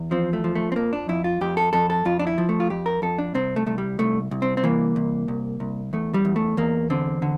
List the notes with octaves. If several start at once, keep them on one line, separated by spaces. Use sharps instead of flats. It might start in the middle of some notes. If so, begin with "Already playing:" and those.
Already playing: E2
F3 C4
A3
F3
A3
C4
F2 A#3
D4
F2 E4
F4
F2 G4
A4
F2 A4
A4
F2 F4
D4
E4
F3
A3
F4
F2 G4
A#4
F2 A4
D4
C2 C4
A3
C2 A3
G3
C2 A3
C2
C4
C4
E3 A#3
C2
C2
C2
E2 A3
G3
E2
A3
E2 A#3
D3 C4
D3